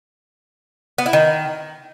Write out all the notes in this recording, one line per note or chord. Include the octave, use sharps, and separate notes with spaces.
B3
E4
D#3